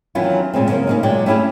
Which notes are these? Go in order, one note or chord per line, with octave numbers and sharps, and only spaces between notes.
D#3 E3 F#3 B3 C#4 F4
A#2 C#3 G#3 C4
C#3 F#3 A#3 C#4 C5
C#3 A#3 D#4
A#2 F#3 G#3 D5 G5
A3 C#4 E4 G4 G#4